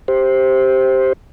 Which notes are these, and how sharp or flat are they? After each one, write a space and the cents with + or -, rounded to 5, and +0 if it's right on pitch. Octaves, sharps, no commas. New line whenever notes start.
G4 +0 C5 +5